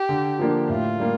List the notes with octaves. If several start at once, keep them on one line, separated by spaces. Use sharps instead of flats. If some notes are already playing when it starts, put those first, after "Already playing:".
Already playing: G4
D3
F3 A#3 D4
A2 F4
G3 A#3